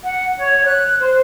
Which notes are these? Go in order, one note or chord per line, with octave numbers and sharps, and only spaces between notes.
F#5
C#5
F#6
C5